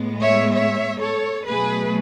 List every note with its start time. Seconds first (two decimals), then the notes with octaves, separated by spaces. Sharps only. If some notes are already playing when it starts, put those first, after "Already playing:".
Already playing: A2 G#3 B3
0.22 C#5 E5
0.53 C#5 E5
0.99 A4 C#5
1.47 B2 F#3 A3 G#4 B4